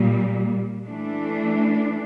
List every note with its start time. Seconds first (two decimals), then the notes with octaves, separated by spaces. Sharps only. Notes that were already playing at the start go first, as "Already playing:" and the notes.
Already playing: A#2 G3 A#3
0.84 E3 A3 D4